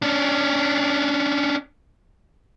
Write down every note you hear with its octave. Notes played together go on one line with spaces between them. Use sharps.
C#4 D4